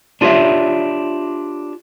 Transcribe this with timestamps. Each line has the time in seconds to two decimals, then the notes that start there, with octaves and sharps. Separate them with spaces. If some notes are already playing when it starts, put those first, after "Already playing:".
0.21 D4 F4 G4 C5 C#5 E5